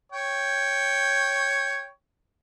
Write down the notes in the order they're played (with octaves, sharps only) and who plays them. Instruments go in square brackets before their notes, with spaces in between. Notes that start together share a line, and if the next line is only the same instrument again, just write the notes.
[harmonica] C#5 G5